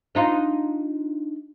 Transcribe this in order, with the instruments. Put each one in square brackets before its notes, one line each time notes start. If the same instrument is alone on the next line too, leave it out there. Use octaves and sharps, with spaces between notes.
[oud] D4 D#4 F4